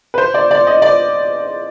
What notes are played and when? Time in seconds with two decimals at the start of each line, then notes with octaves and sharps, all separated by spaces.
0.14 B4
0.18 C5
0.34 D5
0.51 D5
0.67 D#5
0.82 D5